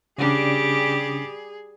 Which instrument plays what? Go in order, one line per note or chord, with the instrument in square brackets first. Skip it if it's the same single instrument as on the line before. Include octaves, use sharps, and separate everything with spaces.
[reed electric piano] C#3 C#4 D4 [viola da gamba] G3 G4 [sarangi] G#4